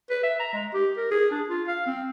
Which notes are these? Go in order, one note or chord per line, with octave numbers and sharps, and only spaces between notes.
B4
E5
A#5
G#3
G4
A#4
G#4
D4
F4
F5
C4